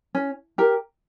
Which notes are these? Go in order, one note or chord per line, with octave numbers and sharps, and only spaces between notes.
C#4
G4 A#4